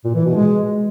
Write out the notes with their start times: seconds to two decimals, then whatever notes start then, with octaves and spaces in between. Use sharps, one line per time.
0.04 A#2
0.15 E3
0.25 B2
0.36 G#3